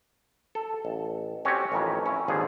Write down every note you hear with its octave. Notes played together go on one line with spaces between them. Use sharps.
A4
A1
C4 C#4 F#4 G4 C#5
A1 F2 D#3 C#4
C#4 E4
G#1 D#2 D3 F3 G#4